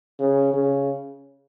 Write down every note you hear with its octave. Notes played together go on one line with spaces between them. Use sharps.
C#3
C#3